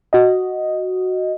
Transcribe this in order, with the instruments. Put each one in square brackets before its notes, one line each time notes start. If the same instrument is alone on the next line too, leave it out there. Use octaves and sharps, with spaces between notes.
[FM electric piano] F#4 D#5